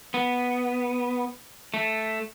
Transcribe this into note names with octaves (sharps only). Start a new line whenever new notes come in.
B3
A3